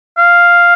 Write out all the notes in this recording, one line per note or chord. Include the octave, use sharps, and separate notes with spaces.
F5